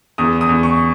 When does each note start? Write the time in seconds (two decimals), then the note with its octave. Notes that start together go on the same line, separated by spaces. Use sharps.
0.18 E2 D#6
0.41 D#6
0.49 E2
0.63 C#6